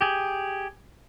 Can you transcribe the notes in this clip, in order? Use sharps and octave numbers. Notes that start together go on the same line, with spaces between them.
G4 G#4